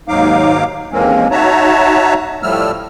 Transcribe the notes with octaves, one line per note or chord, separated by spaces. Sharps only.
D#2 G#2 F#3 D#4 F5 D6
D#2 E3 G#3 A#3 C4 C#4
D#4 F#4 C#5 E5 A5 A#5
A2 F3 G3 A3 E6 F6